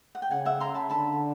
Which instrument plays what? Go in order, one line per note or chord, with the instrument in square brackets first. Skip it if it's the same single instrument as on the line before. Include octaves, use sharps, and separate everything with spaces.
[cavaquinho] F#5
G5
[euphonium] C#3 [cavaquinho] F#5 G#5
[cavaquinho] E5 F#5
A#5 C6
A5 B5
[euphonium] D3 [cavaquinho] A5 B5